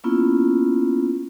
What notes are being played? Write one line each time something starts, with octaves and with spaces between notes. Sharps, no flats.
A#3 B3 C#4 E4 F4